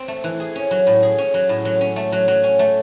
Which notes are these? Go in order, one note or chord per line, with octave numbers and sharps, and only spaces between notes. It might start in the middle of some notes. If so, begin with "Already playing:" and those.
Already playing: C4
A3
E3
G#4
C#4
F#3
A2
G#4
C#4
F#3
A2
F#3
C#4
A3
F#3
F#3
C#4
A3